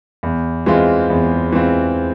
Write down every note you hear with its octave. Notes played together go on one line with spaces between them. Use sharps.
E2
E3 G#3 C4 F4
E2
E3 G#3 C4 F4